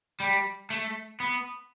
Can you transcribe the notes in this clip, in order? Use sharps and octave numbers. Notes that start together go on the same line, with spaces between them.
G3
A3
B3